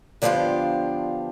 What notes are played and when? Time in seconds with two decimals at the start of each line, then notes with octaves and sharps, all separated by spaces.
0.22 D3 F3 B3 D4 F4 G4